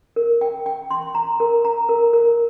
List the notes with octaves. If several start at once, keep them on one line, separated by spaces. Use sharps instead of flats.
A#4
G5
G5
C6
A#5
A#4
A#5
A#4
A#4